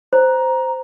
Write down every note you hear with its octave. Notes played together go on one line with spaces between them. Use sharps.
C5 A#5